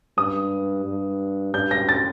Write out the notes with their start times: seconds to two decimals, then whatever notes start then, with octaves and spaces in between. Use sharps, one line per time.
0.17 G2 D#6
0.85 G2
1.54 G2 G6
1.71 A#6
1.89 A6